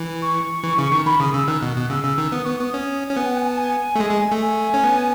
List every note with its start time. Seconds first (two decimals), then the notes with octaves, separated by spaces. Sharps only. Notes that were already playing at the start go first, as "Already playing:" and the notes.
Already playing: E3
0.22 C#6
0.64 E3
0.78 C#3
0.92 D#3
1.06 D#3 B5
1.20 C#3 D#6
1.34 C#3 E6
1.48 D#3 F#6
1.63 B2
1.76 B2
1.90 C#3 E6
2.04 C#3
2.18 D#3
2.32 B3 D#6
2.45 B3 C#6
2.58 B3 D#6
2.74 C#4
3.10 C#4
3.16 B3 G#5
3.26 F#5
3.37 G#5
3.47 A5
3.58 G#5
3.95 A3
4.00 G#3
4.11 G#3
4.32 A3
4.42 G#5
4.74 C#4
4.84 B3